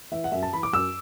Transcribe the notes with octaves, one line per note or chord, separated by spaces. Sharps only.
E3 E5
F#5
F#2 E5
A5
E3 B5
D6
F#2 E6